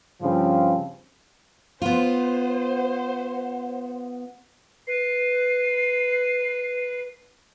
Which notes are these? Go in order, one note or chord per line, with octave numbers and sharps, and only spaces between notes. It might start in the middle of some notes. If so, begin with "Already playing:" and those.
G2 C#3 F3 C4
B3 F4 C5 F#5
B4 C7